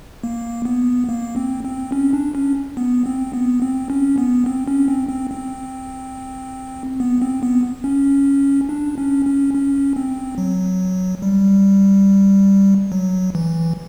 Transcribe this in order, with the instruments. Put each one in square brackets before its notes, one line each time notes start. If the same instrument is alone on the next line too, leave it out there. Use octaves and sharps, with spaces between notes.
[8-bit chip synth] A#3
B3
A#3
C4
C4
C#4
D4
C#4
B3
C4
B3
C4
C#4
B3
C4
C#4
C4
C4
C4
B3
C4
B3
C#4
D4
C#4
C#4
C#4
C4
F#3
G3
F#3
E3